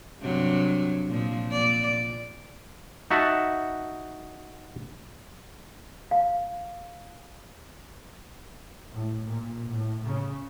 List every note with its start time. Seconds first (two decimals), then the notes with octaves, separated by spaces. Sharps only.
0.21 G2 C3 F#3
1.08 A#2 F3
1.51 A#2 D5
3.11 D#4 F#4 E5 F#5 A5
6.11 F5
8.93 A2
9.29 A#2
9.69 A2
10.05 C#3